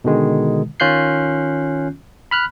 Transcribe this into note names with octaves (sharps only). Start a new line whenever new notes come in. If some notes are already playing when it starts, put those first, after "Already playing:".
B2 D3 D#3 G#3
D#3 C#4 F4 F#6 G6 C7
B5 F6 F#6